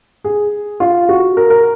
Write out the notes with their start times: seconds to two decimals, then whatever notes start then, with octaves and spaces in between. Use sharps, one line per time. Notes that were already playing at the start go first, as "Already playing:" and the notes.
0.24 G#4
0.80 F4
1.09 F#4
1.37 A#4
1.50 A#4